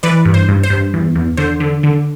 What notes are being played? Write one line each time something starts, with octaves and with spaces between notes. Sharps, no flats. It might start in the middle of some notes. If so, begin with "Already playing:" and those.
E3 B4 D5
G2
C5
G2
C5
G2
E2
E2
D3 C5
D3
D3